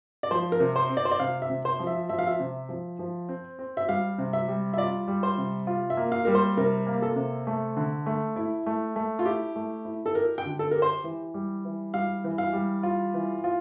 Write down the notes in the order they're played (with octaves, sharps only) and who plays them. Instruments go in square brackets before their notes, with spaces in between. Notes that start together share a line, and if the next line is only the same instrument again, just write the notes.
[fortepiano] D5
[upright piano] F3 [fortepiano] C5
[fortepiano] A#4
[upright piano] C3
[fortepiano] C5
[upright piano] C4
[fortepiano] D5
C5
D5
[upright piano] C3 [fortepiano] F5
[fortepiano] E5
[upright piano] C3
[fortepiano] C5
[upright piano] F3
[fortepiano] E5
[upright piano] F3 [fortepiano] E5
[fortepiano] F5
E5
[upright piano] C3
F3
F3
C4
C4
[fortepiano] E5
[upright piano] G3 [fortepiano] F5
[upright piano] C3
[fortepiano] E5
[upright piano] G3
[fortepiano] E5
[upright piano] F4 [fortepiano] D5
[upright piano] G3
[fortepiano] C5
[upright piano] C3
F4
[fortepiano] E5
[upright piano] A#3
[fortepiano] F5
[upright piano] G3 [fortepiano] A#4
[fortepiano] C5
[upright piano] C3 [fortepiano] A#4
[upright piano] A#3
[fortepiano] A4
[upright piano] C3
A3
D3
A3
E4
A3
A3
[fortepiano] F4
[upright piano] E4 [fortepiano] G4
[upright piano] A3
E4
[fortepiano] A4
[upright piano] G4 [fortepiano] A#4
[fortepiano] G5
[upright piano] D3
[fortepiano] A4
[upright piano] G4 [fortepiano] A#4
[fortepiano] C5
[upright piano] E3
G3
E3
[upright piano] G3 [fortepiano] F5
[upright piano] E3
[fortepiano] F5
[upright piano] G3
F4
E3
F4